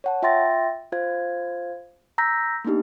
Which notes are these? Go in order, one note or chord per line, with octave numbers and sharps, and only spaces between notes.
C#5 F#5 A5
F4 E5 G5 C6 A6 A#6
F4 C5 F5 G#6
A#5 E6 G6 A#6 B6
A#3 B3 D4 D#4 G4